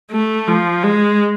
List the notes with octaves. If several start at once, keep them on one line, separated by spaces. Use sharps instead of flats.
A3
F3
G#3